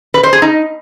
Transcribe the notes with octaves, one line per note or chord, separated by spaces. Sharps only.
B4
C5
G#4
D#4